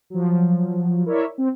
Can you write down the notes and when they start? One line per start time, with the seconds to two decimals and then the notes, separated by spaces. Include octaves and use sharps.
0.10 F3 F#3
1.05 E4 A#4 C#5 D5 E5
1.38 C4